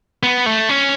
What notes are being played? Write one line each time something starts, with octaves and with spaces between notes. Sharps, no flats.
B3
A3
C#4